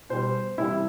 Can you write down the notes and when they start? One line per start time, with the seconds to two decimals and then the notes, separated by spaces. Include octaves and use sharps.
0.10 B2 G3 C5
0.58 C3 E3 G3 E4